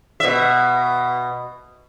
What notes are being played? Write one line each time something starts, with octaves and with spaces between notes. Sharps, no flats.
B2 E5